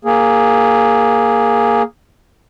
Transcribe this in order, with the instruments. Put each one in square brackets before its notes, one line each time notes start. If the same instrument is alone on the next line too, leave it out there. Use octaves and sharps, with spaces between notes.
[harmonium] A#3 G#4